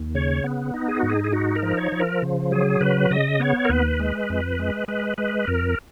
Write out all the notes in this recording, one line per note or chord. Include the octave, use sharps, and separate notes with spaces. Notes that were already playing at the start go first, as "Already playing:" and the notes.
Already playing: D#2
C#3 C#5
B3
D#4
G#4
G#2 F#4
G#4
G#4
D#4 F#4
A#4
F3
C#5
F3
A#4
C#3
F#3 G#4
C#3 B4
C#3 D#5
B3 C#5
A#4
D#2 B4
G#3
F2
G#3
G#3 B4
G#3 B4
F2 A#4